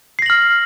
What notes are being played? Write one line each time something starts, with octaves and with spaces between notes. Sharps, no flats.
F6 A#6 C7 F#7